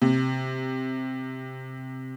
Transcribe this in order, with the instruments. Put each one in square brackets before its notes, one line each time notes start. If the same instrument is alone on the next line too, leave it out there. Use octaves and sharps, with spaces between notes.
[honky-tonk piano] C3